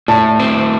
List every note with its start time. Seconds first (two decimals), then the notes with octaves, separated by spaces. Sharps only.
0.08 A2 A5
0.39 C4